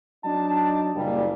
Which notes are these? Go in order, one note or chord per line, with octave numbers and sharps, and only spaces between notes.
F#3 D4 D#4 D5 A5
F#1 A#2 G3